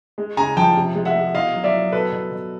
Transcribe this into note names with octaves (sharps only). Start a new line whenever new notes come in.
G#3
C#3 G#5 A#5
F3 G5 A5
C3
G#3
E5 F#5
G#3
B2 D#5 F5
F#3
D5 E5
F#3
B2 A4 B4
B2
B2